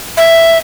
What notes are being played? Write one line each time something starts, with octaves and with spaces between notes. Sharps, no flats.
E5